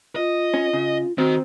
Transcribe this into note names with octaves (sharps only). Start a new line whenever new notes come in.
F4 D#5
C#4
C#3
D#3 C4 F#4